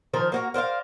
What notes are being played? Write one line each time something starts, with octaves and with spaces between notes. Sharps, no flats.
D#3 F3 A#4 C5
A#3 F#4 A#5
A#4 C5 D5 F5